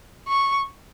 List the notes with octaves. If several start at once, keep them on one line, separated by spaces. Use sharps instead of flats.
C#6